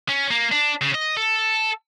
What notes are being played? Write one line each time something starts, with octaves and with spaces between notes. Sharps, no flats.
C#4
A#3
D4
C#3
D#5
A4